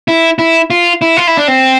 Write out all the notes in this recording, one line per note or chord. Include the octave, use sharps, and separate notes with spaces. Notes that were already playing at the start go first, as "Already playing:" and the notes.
E4
E4
F4
E4
F4
E4
D4
C4